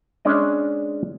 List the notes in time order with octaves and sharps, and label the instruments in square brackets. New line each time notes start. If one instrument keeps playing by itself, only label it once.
[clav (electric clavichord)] G#3 C#4 D4 D5 D#5